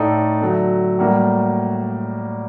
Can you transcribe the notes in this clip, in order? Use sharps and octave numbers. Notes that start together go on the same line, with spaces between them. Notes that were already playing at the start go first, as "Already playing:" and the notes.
Already playing: A2 A3 D#4 A4 D5
D3 F#3 A3
A2 G3 A#3 F#4